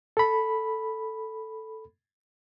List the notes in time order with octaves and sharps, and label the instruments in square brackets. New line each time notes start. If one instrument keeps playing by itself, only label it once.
[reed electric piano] A4 B5